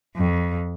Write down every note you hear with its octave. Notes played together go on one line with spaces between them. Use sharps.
F2